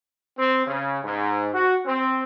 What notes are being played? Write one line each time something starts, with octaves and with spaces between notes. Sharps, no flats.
C4
C#3
G#2
F#4
C4